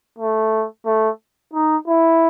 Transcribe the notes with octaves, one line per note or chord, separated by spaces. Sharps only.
A3
A3
D#4
E4